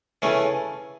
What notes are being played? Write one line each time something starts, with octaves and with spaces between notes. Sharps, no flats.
C#3 E3 A3 C#4